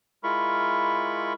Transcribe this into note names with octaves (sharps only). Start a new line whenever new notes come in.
G#3 E4 F4 A#4 B5 C#6